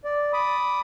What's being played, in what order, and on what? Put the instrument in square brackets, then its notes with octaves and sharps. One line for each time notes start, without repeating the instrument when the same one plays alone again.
[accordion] D5
B5 D6 D#6